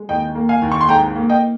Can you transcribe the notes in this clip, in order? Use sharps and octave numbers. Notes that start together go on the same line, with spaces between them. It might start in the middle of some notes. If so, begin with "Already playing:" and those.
Already playing: G#3
D#2 D#5 G5
A#3
F5 G#5
D#2
C#6
C6
G#2 G5 A#5
A#3
D#5 G5